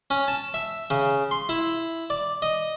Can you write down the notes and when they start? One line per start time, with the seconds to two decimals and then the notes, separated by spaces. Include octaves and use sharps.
0.10 C#4
0.28 A5
0.54 E5
0.90 C#3
1.31 C6
1.49 E4
2.10 D5
2.42 D#5